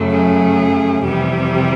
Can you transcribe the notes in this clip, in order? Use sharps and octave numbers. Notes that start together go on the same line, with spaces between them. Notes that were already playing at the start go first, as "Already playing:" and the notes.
Already playing: F#2 C#3 F#3 A3
G#4
F2 C3 E3 G3 G4